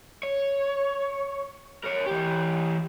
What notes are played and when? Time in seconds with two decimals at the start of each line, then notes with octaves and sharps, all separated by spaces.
0.23 C#5
1.84 A#4 C#5
2.06 E3 G4